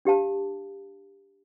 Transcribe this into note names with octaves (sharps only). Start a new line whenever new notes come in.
D4 G4 F5 A5